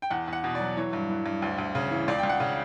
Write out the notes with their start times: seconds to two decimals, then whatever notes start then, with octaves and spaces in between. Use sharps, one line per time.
0.02 G5
0.10 E2 F#5
0.28 E2 F#5
0.44 B2
0.55 F#3 D5
0.77 E3 C#5
0.93 G2
1.10 E3
1.26 G2
1.42 D2
1.58 D2
1.75 C#3
1.91 E3
2.08 C#2 D5
2.19 C#2 G5
2.29 F#5
2.40 C#3